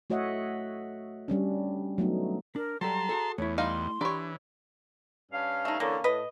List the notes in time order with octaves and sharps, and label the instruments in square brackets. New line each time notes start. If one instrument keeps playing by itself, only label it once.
[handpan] A3 F#4 C#5 D#5 E5 F#5
G3 C#4 D4
F#3 A3 B3 D#4
[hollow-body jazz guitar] D4 [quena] A#4
[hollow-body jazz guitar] F#3 G3 A4 [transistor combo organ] A5 C6 [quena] A#5
[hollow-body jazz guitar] F#4 G#4 A4
[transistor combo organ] E2 [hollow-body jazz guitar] A3 E4 [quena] C#5
[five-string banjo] G3 D#4 F5 [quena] C6
[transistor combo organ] E3 [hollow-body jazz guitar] D4 G4 B5 [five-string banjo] C#5 D5
[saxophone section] G2 C#4 F5
[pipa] A3 D#4
[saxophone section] D3 E3 C#4 [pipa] A#3
[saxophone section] A2 [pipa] B4 D#5